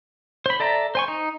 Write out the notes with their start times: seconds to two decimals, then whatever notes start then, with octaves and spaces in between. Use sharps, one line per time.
0.46 C5 B5
0.60 A4 D5 E5 A#5
0.95 C5 G#5 C#6
1.08 D#4